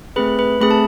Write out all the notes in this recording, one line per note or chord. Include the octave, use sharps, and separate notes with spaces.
A3 C4 G#4 B4 B5
B4 B5
A3 C4 G#4 B5
A5